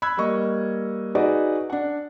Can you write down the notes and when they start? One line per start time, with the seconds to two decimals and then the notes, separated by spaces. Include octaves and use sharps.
0.02 B5 E6 F#6 G#6
0.17 G3 A#3 D#5 C#6
1.15 D#4 F#4 G#4 B4 D5 D#5
1.70 D4 F#5